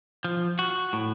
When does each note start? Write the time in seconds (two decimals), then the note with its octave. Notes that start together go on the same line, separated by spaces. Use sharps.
0.25 F3
0.59 F#4
0.93 A2